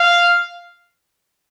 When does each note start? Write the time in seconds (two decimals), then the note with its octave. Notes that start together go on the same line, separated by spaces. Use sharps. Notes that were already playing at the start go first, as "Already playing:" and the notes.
Already playing: F5